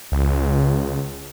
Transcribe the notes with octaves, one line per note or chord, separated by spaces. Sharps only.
C#2